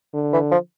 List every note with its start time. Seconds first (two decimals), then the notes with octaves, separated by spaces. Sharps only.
0.13 D3
0.33 E3
0.51 F3